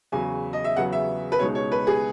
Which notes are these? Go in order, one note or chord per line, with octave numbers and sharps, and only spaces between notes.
E2 C#3 F#3 G#5
D#5
E5
E2 C#3 F#3 B3 F#5
E5
B4
C#2 B2 G#3 D#4 C#5
C#5
B4
G#4